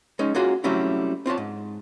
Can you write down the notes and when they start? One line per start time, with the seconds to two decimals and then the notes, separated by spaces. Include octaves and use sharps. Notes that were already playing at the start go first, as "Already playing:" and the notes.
0.19 G#3 C#4 D#4
0.35 A#3 C#4 F4 F#4 G#4
0.64 F#3 G3 A3 C4 C#4 E4
1.26 C4 F4 C#5 A5
1.38 G#2